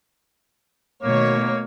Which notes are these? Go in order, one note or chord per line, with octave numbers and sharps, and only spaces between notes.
B2 D#3 A3 A#3 C#5